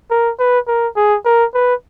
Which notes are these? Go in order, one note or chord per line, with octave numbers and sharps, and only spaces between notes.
A#4
B4
A#4
G#4
A#4
B4